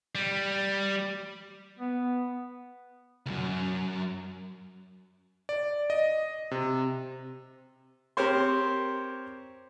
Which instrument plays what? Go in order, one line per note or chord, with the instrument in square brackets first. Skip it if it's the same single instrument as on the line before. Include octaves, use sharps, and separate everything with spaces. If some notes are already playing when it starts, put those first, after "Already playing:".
[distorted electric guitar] G3
[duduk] B3
[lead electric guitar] C#2 F#2
[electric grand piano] D5
D#5
C3
[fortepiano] C4 G4 A#4 C5 C#5 C6